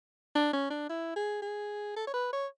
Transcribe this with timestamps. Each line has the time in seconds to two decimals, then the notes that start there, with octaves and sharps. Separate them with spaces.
0.35 D4
0.53 C#4
0.70 D4
0.89 E4
1.16 G#4
1.42 G#4
1.96 A4
2.07 C#5
2.14 B4
2.33 C#5